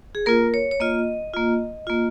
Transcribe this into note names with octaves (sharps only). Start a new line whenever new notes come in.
G#4
A#3 F4 A#4
C#5
C#5
A#3 F4 D#5
A#3 F4
A#3 F4